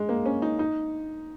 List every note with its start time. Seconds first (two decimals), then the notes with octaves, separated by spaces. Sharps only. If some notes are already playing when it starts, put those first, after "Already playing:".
Already playing: G#3
0.09 A#3
0.26 C#4
0.42 D#4
0.59 D#4